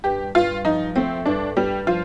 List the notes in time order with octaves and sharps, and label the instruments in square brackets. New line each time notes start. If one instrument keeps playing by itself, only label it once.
[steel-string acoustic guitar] G2 [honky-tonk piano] G4
[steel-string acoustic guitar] G2 [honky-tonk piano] F4
[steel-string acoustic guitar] F3 [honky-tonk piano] D#4
[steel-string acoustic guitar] A3 [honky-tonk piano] C4
[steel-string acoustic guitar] G2 [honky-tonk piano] D4
[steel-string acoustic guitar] G2 [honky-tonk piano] G3
[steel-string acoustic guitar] F3 [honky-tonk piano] F4